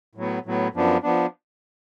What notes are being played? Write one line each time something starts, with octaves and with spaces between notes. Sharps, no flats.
A2 F#3 B3
A2 F#3 B3
F#2 F3 B3 D4
F3 B3 D4